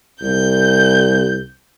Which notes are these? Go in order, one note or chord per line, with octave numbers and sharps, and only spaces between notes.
C2 G6